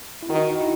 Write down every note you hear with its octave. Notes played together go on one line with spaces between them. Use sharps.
E4
D#3 D#4 F#4
D#4
E4